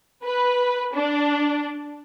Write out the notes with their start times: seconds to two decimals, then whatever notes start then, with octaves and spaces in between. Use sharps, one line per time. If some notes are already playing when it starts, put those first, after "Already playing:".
0.23 B4
0.93 D4